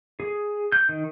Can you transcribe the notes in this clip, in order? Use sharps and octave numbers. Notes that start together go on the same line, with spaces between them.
G#4
G6
D#3